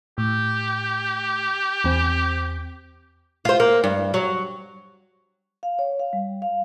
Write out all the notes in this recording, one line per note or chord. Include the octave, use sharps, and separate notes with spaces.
A2 G4
E2 C4
F4 C5
A#3
G2
F#3
F5
C#5
F5
G3
F5